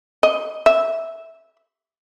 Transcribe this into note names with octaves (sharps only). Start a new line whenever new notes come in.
D#5
E5